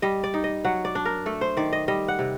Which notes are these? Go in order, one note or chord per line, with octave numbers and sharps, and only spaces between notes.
G3 D#5
D5
D#4
D#5
F#3 F#5
D5
D4
A#4
A3 A4
C5
D#3 D5
D#5
G3 D#5
F#5
C3